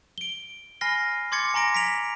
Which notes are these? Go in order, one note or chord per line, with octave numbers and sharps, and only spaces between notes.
D7 G7
G#5 B5 F6 A#6 C7 G7
C6 D6 G#6 A6 C#7
G#5 A#5 C6 A#6 D7
B6 D7 F7